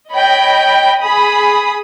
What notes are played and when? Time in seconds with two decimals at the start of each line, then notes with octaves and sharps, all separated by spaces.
0.13 C#5 D#5 G5 B5
1.00 G#4 B5 D#6